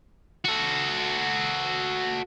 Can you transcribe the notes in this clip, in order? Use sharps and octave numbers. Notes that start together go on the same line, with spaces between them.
F#4 A4